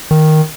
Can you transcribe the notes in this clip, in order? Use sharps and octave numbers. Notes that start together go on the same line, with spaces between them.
D#3